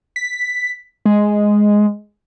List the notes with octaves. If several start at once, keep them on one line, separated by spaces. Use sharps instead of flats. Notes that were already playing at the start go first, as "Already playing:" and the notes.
B6
G#3